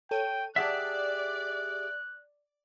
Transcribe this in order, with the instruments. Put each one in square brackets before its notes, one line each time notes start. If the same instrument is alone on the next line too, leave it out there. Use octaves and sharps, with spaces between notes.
[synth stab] A4 C#5 D#7 [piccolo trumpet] G5
[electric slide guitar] G4 G#4 E5 [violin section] D5 [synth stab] F#5 A5 E6 [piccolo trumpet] F#6